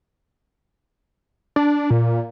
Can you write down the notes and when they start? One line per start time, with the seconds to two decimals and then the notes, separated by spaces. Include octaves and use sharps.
1.56 D4
1.90 A#2